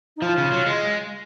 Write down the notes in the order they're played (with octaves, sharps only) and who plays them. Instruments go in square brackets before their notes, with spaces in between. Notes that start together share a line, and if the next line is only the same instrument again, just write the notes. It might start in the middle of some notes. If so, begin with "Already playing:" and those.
[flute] D#4
[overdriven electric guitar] F3 [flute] F4
[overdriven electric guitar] C#3
F#3
G#3